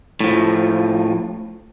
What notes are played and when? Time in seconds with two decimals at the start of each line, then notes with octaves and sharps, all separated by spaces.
0.20 A2 F3